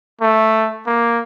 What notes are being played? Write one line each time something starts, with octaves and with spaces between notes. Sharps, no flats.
A3
A#3